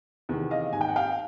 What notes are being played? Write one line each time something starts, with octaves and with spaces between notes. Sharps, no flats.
E2 C3 D#3
D#5 F5
G#2 G#5
G5
F#5
F5 G5